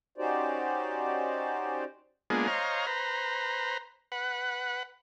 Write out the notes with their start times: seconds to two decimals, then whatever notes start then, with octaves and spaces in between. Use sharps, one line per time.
0.18 C#4 D#4 F#4 G4 C5 D5
2.30 G#3 A#3 B3 D4 F4 G#4
2.48 C5 C#5 D#5 F5 A#5
2.87 B4 C5 A#5
4.12 B4 F#5